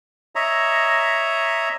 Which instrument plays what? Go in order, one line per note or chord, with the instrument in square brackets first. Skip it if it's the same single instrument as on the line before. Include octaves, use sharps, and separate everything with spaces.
[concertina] C#5 D#5 E5 A#5